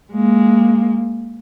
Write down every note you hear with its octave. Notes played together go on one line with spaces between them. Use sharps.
G#3 A#3